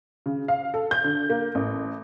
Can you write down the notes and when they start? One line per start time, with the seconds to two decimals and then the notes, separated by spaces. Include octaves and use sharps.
0.26 C#3
0.48 F5
0.74 A4
0.91 G6
1.04 D3
1.30 A#3
1.55 A1